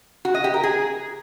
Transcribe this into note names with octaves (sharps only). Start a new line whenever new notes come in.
F#4
D#5
G4
A#4
G#4